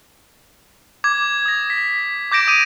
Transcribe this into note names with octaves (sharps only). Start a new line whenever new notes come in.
D6 G#6
D#6 A#6
B6
D6 G6 A#6 D7 E7
D#6 D#7